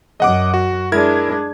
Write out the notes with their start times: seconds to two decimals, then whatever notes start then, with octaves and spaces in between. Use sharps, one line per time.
0.20 F#2 D#5 F#5 D6
0.54 F#4
0.92 G#3 D4 E4 A#4 G#6